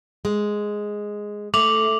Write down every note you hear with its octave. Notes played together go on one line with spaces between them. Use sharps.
G#3
A3 D6 F7 F#7